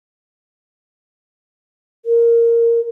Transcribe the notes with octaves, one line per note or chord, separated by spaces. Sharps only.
A#4